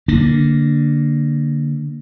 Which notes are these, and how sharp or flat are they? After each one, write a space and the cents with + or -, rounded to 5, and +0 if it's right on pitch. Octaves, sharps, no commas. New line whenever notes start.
D3 +0 A#3 +0 D4 +0